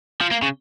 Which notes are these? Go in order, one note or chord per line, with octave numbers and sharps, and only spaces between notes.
F3
A#3
C#3